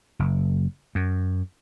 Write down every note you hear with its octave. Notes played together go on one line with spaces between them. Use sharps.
F#1
F#2